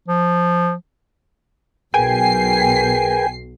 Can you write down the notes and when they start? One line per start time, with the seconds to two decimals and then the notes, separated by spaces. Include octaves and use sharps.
0.08 F3
1.94 B1 G#4 A#4 B4 G5 G#5 C7